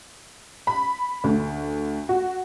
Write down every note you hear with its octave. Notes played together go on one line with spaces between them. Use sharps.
B5
D2
F#4